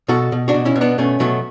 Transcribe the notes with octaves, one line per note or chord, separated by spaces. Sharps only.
B2 F#4 A4
B2
D4 F#4
B2
C#4 E4
B2
B3 D4
B2 A3 C#4
B2 F#3 A3